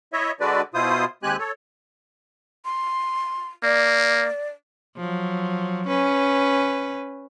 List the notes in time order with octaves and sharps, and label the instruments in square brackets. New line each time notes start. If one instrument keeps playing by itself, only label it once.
[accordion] E4 C#5 D#5 E5
D3 G#3 D4 F#4 B4 D5
B2 E4 F4 C5 D#6
D#2 G#3 C4 G4 G#5 F#6
A4 C#5
[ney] C6
[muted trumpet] A#3 [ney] D5
[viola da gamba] F3 F#3
C#4 B4